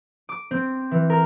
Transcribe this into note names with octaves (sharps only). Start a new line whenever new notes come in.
D6
C4
E3
A#4